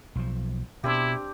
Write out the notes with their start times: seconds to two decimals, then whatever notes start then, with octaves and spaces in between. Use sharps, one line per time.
0.15 B1 F3
0.84 B2 C4 D4 E4 G4